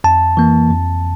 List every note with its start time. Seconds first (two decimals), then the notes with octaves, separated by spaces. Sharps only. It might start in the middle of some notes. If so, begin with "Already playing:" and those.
0.04 F2 A5
0.37 E3 A#3
0.70 F2